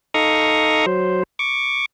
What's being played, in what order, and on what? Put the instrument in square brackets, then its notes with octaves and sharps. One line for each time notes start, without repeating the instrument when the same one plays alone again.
[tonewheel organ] D#4 A4 F5 A#5 C#6 D#6
F#3 C5
C#6 D6